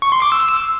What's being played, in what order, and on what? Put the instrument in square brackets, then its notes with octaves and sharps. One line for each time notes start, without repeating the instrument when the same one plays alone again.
[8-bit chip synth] C#6
C6
D6
E6